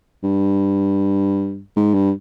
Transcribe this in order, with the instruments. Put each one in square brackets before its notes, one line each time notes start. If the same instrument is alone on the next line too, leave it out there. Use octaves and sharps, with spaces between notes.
[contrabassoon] G2
G#2
G2